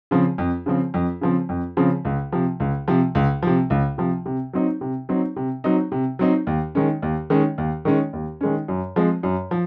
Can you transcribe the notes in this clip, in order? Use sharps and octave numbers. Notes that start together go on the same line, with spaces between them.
C#3 F3 C4
F2
C#3 F3 C4
F2
C#3 F3 C4
F2
C#3 F3 C4
C#2
C3 F3
C#2
C3 F3
C#2
C3 F3
C#2
C3 F3
C3
F#3 C4 D#4
C3
F#3 C4 D#4
C3
F#3 C4 D#4
C3
F#3 C4 D#4
D#2
D#3 G#3 C#4
D#2
D#3 G#3 C#4
D#2
D#3 G#3 C#4
D#2
D#3 G#3 C#4
F#2
F3 G#3 C4
F#2
F3